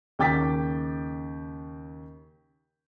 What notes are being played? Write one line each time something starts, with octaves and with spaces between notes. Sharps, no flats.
D#2 C#3 G5 D6 A6 B6